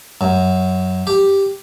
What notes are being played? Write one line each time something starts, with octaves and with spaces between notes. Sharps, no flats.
F#2
G4